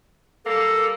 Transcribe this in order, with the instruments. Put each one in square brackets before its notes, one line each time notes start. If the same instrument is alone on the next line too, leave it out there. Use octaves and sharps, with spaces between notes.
[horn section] G3 A#3 [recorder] A4